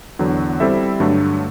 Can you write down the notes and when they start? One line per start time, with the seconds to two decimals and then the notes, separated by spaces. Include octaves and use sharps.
0.19 E2 D3 F#3
0.60 G3 C4 E4 A4 E5
1.00 G2 D3 F#3 A3